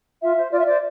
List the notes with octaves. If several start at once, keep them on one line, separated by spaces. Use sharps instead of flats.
F4 E5
C5
F4 D5
E5
C5 D5